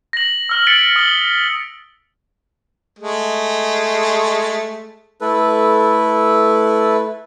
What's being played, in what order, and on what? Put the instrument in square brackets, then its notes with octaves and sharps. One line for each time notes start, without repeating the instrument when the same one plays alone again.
[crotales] A#6 F#7
E6 F6 F#7
A6 B6 C#7 D7 F#7
D#6 F#7 G7
[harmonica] G#3 A3
[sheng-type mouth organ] A3 E4 A4 B4